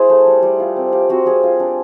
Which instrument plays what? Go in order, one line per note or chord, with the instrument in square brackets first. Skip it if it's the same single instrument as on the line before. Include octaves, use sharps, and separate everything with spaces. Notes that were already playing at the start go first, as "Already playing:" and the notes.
Already playing: [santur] E4 G#4 C5
A3
G3
G3
F4
C4
F4 G4
C4 F#4
G3 G#4
F4
D4